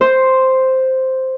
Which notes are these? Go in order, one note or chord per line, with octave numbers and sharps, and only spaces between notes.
C5